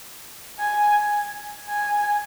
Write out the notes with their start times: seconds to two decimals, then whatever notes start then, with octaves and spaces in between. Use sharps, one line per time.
0.59 G#5
1.69 G#5